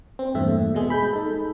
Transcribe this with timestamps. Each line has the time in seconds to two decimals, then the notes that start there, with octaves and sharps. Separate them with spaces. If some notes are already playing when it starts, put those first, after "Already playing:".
0.19 C4
0.34 E2 G2 A#2 A3 E5
0.75 B2 G#3 G#4
0.90 B5 G6
1.13 D#4 A4